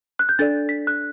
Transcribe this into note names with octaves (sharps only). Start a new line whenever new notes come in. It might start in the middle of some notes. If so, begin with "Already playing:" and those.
F#6
G6
D4 A4 D5 A6
B6
F#6